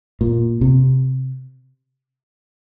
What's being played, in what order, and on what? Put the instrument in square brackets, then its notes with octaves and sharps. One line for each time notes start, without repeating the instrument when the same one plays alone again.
[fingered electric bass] A#2
C3